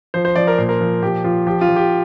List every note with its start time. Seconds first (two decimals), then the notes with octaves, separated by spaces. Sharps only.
0.14 F3 C5
0.25 C5
0.36 F3 D5
0.47 A#4
0.58 A#2 C5
0.69 A#4
0.80 F3
1.02 A#2 G4
1.24 F3 F4
1.47 F3 G4
1.61 F4
1.69 F3
1.76 G4